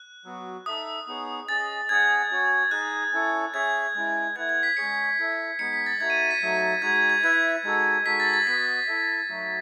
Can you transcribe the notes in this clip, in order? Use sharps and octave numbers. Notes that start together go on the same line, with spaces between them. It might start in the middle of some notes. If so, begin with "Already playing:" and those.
Already playing: F#6
F#3 B3 F#4
D#4 A4 E5 D#6
B3 D#4 G#4 C#5
C#4 G#4 D#5 A6
C#4 G#4 D#5 F#5 G#6
C#4 F#4 C#5
D#4 G#4 D#5 F#6
C#4 E4 A4 C#5
C#4 G#4 C#5 E5 G#6
G#3 C#4 E4
A3 E4 B4 F#5 G#6
G#6
B6
G#3 C#4 G#4 C#5 C#7
E4 A4 E5
G#3 B3 D#4 C#7
B6
A6
A3 D#4 F#4 G#6
D#7
D#7
B6
F#3 A3 D#4
G#3 D#4 F#4 G#6
G#6
G#6
E4 B4 E5 G#6
G#3 D#4 F#4 A4
G#3 D#4 F#4 A4 B6
A6
A6
B3 F#4 B4 D#5 B6
E4 A4 E5
F#3 A3 D#4 F#4